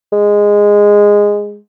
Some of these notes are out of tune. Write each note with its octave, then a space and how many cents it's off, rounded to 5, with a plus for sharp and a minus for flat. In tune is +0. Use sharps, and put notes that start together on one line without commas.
G#3 -10